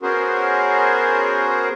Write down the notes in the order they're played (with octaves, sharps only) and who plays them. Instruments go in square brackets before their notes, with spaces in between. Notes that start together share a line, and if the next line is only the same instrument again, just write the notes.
[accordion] B3 C#4 F#4 G#4 A#4 C5